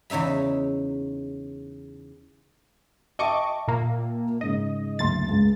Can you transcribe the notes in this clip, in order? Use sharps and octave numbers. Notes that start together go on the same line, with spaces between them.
E2 C#3 D#4 E5 B5
D#5 E5 G5 A5 C#6 D6
A#2 A#3
G#2 C#3 D#5
F#1 D2 C6 A6
C#2